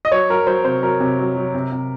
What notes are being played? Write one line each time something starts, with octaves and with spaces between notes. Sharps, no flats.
D#5
F#3 C#5
F#3 A#4
F#3 C5
C3 C5
F#3 A#4
C3
F#3
F#3
C3
C3